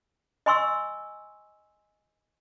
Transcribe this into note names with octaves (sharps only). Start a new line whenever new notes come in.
D#5 G#5 C6 C#6 E6